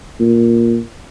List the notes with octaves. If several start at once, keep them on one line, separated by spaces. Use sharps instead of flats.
A#2